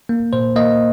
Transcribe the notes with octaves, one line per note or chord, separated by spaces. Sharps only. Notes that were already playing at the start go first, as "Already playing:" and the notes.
A#3
A#2 C5
A#3 D#5